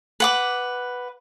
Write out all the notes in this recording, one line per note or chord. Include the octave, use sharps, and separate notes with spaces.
B4 F#5 D6